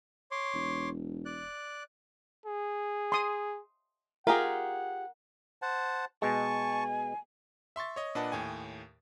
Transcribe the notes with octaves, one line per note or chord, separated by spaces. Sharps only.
C#5 C6 D6
E1
D5 F#6
G#4
C6 D#6
F4 G4 G#4 A#4 F#5
C5 F#5 A5
B2 G#3 G#5 A5 C#6
E5 C6 C#6 A6
C#5 D#5
A#2 D4 B4 D#5 F#5 A5
D#2 A2 G5 G#5